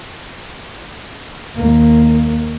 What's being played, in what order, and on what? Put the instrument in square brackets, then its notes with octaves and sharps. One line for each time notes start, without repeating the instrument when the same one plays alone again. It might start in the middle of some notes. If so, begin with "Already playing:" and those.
[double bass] D#2 A#3